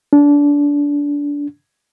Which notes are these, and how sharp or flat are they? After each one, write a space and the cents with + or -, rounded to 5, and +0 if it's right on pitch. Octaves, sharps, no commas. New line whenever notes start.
D4 -25